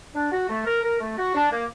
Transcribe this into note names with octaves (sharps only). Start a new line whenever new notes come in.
D4
F#4
A3
A#4
A#4
A3
F#4
D4
A#3